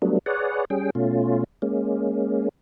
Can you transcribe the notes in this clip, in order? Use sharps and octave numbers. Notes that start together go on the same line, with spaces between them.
F#3 G3 A3 B3 D4
G#4 B4 C#5 D5 F#5
G3 C#4 G#4 G5
B2 A3 C#4 F4
G#3 A#3 C#4